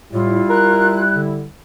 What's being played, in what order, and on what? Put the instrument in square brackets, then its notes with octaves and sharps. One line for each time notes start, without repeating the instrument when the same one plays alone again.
[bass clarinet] A2 [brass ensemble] G3 E4 [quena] F4
[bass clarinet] A#4 [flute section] F#6
[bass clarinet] D3